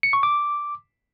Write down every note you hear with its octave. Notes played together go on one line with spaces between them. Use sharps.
C#7
C#6
D6